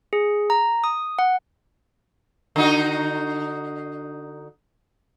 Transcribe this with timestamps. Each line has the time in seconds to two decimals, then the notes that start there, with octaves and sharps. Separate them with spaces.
0.13 G#4
0.50 A#5
0.84 D#6
1.19 F#5
2.56 D3 D#4 F#4